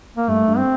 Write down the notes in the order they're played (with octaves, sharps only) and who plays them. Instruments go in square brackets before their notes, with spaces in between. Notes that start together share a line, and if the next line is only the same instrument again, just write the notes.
[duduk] A#3
[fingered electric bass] G2 [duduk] A3
[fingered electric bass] G2
[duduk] C4